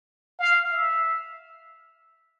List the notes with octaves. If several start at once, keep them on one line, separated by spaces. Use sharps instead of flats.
F5
E5